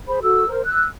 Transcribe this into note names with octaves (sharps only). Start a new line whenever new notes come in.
G#4 C5 B5
F#4 A4 E6
A#4 C5
E6 F#6